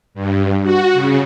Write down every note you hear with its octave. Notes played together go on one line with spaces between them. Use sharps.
G2
F#4
C#3